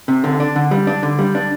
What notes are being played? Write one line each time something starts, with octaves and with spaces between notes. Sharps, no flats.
C3
D3
D4
D3
G3
D4
D3
G3
D4